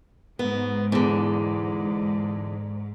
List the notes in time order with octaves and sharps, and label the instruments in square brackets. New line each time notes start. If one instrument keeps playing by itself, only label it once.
[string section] G#2 [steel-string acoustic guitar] B3
[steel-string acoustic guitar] E2 D3